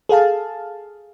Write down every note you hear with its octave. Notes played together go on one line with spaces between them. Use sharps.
G#4 A4 F5 A5